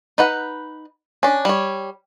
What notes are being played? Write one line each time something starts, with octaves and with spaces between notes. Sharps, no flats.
D#4 B4 F#5
C#4 D4
G3 C#5